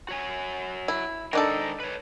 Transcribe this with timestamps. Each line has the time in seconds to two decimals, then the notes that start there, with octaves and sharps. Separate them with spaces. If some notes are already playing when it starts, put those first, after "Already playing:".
0.09 F#4 C#5 G#5
0.88 E4
1.33 G#2 D#3 D4 D#4 A4 A#4
1.80 B4 C#5